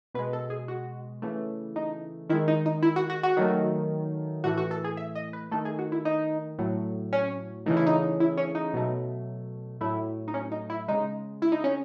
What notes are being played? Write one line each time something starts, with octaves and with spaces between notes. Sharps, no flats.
B2 G#3 B4
A4
G#4
F#4
C#3 E3 A3
D#4
D#3 G#3 E4
D#4
D#4
E4
F#4
F#4
F#4
D#3 F#3 A3
A2 E3 A3 F#4
F#4
A4
G#4
E5
D#5
B4
D#3 A3 A4
G#4
F#4
E4
D#4
A2 F#3 A3
C#4
C#3 E3 A3 D#4
E4
D#4
E4
C#4
D#4
B2 F#3 A3
A2 F#3 A3 E4
D#4
C#4
D#4
E4
C#3 G#3 D#4
E4
D#4
C#4